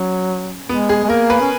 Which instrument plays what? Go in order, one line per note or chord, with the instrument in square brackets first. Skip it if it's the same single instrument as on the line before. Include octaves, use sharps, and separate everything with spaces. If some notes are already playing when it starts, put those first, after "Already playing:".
Already playing: [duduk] F#3 [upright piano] C#4
[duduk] G#3 [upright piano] B3
[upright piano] G#4
[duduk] G#3
[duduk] A#3 [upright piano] A#4
[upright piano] B4
[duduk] C#4